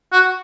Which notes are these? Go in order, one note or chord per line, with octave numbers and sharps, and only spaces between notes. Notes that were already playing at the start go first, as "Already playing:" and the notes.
F#4